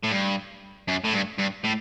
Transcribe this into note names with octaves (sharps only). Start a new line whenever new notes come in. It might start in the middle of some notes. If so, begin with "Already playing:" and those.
A2
G2
F#2
A2
G2
G2
A2